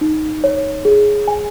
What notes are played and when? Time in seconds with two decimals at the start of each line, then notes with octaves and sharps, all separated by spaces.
0.01 D#4
0.44 C#5
0.85 G#4
1.28 G#5